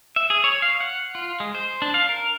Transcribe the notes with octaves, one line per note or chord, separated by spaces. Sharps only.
E5
G#4
C#5
F5
F#5
F4
G#3
C5
D4
F5
A#4